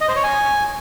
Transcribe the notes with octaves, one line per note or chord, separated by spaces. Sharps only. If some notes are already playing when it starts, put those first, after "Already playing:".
D#5
C5
C#5
G#5